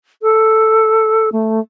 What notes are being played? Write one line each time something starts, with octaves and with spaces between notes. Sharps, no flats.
A4
A3